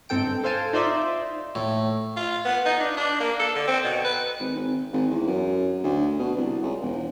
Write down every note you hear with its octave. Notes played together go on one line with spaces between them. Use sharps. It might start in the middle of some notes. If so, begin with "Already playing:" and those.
G1 G#2 C4 A4 G5 D7
A4 C5 F5 G#5 A5
D#4 F4 C5 D5 E5 C6
A2
F4
B3
D#4
D4
D4
A#3
A4
D3
C4
B2
B4
G#1
G#1
G#1
E2
F#2
D2
B2
C2
C#2
E1